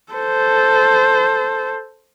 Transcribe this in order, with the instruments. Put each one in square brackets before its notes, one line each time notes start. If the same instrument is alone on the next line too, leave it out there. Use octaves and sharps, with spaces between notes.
[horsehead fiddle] A4 C5